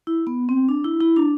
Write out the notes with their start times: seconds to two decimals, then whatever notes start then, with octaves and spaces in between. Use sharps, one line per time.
0.07 E4
0.27 B3
0.49 C4
0.69 D4
0.85 E4
1.01 E4
1.16 D4